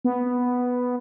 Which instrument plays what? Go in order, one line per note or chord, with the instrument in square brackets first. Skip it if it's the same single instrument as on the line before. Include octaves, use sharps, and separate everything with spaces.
[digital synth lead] B3